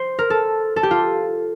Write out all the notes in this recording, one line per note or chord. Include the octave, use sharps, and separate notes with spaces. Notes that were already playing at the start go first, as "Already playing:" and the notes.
Already playing: C5
A#4
A4
A4
G4
F4